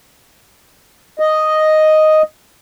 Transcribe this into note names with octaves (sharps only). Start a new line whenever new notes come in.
D#5